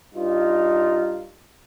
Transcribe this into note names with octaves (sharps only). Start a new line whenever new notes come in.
G2 D#4 F4